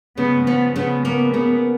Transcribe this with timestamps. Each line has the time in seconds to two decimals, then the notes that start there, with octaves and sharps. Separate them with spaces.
0.17 C#3 B3
0.46 F3 B3
0.76 C#3 B3
1.05 A#3 B3
1.34 C#3 B3